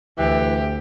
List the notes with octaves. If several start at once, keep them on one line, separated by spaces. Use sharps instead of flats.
D2 E3 G4